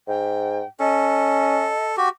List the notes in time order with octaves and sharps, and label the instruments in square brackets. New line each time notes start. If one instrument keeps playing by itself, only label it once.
[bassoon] G#2 [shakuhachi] G5
[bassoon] C#4 [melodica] A4 [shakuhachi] D#5
[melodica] F#4 G4